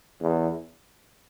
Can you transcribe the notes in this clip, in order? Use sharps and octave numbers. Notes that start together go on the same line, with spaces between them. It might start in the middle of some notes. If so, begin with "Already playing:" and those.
E2